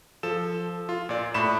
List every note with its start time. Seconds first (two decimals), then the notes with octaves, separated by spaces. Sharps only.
0.23 F3 A4 E7
0.89 F4
1.09 A#2 D5
1.34 A2 B5 E7